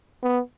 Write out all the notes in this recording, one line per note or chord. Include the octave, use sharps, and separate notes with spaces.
B3